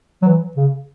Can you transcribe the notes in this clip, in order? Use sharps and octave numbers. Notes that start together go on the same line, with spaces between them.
F#3
E3
C#3